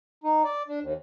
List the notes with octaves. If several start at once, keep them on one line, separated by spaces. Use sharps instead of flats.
D#4
D5
D4
D#2